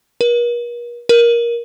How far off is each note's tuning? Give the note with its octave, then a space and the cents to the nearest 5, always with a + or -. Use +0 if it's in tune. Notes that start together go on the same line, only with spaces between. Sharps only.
A#4 +45
A#4 +15